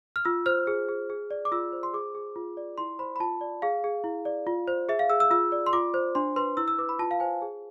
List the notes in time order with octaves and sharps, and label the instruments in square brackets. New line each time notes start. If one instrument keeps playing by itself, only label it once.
[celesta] F6
F4 E6
C5 F6
G#4
G#4
G#4
D5
D6
F4 E6
C5
C6
G#4 D6
G#4
F4
D5
E4 C6
C5 B5
B5
F4 A5
D5
G#4 F5
G#4
E4
D5
F4
C5
G#4 E5
F5
G#4 E6
E6
F4 E6
D5
C6
F4 D6
C5
D4 C6
B4 C6
E4 E6
E6
B4 D6
B5
F4 A5
F5
C5 G#5
G#4